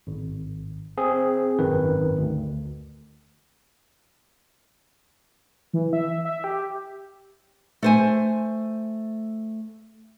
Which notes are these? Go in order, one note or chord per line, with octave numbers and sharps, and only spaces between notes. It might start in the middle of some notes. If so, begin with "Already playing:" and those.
G#1
C4 G#4
G#1 F#2 D#3 B4
D2
E3
E5
E5
G4
A3 C5 G#5